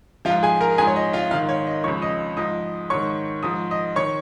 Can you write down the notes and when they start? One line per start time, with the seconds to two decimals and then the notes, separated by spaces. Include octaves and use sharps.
0.25 F3 F4 F5
0.30 G#2
0.43 G#4 G#5
0.61 A#4 A#5
0.78 G#2 F3 G#4 G#5
0.87 C#5
0.96 D#5
1.13 F4 F5
1.31 G#2 D#3 F4 F5
1.49 C#5
1.67 D#5
1.84 C#2 C#3 F3 C#5 C#6
2.02 D#5 D#6
2.37 G#2 F3 D#5 D#6
2.90 G#2 D#3 C#5 C#6
3.43 G#2 F3 D#6
3.71 D#5 D#6
3.96 D#3 C#5 C#6